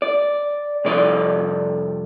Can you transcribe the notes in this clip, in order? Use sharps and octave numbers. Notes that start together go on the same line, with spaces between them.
D5
C2 F2 D5